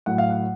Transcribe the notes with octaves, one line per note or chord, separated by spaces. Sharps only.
A2 F#3 F#5
F5
F#5